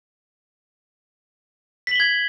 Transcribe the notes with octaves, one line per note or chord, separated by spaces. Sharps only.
G#6 B6 F#7 G7